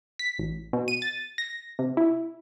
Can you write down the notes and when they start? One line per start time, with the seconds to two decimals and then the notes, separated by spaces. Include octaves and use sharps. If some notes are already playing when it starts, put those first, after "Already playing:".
0.19 B6
0.39 A1
0.73 B2
0.88 D#7
1.02 A6
1.38 A#6
1.79 C3
1.97 E4